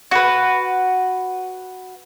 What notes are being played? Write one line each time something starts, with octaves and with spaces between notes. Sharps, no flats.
F#4 B4